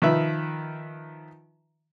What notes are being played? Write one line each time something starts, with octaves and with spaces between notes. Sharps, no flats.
D#3 F3 B4 E5